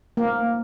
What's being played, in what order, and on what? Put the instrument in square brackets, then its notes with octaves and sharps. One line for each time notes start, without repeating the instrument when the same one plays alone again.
[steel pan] A#3